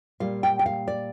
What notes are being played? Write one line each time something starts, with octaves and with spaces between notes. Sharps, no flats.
A#2 G3 F5
G5
G5
F5
D5